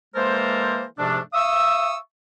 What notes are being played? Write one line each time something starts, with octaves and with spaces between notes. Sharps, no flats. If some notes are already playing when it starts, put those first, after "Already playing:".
E3 G#3 A#3 A4 A#4 C5
G#2 C3 F3 A3 D4
E5 F5 C#6 D#6 E6